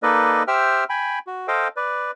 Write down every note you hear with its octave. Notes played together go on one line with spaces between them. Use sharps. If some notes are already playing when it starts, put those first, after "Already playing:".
A#3 D#4 A4 B4 D5 D#5
G4 C5 E5 G5 E6 F6
G5 G#5 B5
F#4
A4 C5 D#5 F5 G5
B4 D5